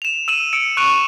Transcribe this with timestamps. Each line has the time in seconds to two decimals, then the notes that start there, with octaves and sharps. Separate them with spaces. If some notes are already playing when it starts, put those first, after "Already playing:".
0.02 E7 F7
0.28 E6 D#7 E7 F#7
0.53 E6 C#7 D7
0.77 C#6 F#6 D7 D#7 F7